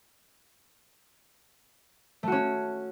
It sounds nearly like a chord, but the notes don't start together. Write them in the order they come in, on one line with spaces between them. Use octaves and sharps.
A3 F#4 C#4